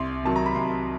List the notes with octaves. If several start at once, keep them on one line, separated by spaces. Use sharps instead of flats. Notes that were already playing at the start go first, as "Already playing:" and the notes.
Already playing: C2 C6
C3 D#3 F#3 A5
A#5
B5
C2 C6